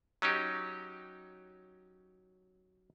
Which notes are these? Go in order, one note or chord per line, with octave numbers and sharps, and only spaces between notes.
F#3 C#4 D#4 G4